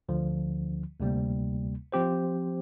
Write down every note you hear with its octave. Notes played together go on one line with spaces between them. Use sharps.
D2 D3 F3
D2 C3 G3 A#3
F3 C4 G4 C5